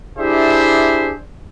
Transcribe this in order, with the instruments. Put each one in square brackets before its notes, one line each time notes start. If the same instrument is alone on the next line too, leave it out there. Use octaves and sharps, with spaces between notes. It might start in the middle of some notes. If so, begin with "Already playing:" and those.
[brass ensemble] D4 E4 G4 G#4 C5 E5